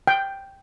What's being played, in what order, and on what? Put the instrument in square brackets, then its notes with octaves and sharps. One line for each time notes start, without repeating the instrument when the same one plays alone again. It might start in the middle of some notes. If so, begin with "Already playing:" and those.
[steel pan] G5